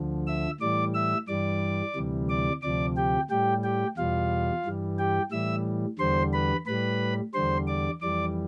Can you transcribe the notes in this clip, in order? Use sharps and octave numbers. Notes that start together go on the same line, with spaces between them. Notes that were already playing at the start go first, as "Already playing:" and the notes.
Already playing: D2 D3 F3
E5 E6
A2 E3 G3 D5 D6
E5 E6
G2 E3 G3 D5 D6
D2 C3 E3 G3
D5 D6
D2 C3 F3 D5 D6
G4 G5
A2 G3 G4 G5
G4 G5
E2 B2 G3 F4 F5
G2 E3 G3
G4 G5
A2 E3 G3 E5 E6
E2 D3 G3 C5 C6
B4 B5
A2 G3 B4 B5
E2 D3 G3 C5 C6
D5 D6
F2 E3 G3 D5 D6